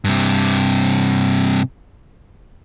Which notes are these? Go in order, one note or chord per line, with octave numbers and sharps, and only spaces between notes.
G2 C3